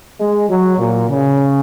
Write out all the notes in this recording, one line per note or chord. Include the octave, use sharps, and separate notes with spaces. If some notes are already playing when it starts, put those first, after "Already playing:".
G#3
F#3
A#2
C#3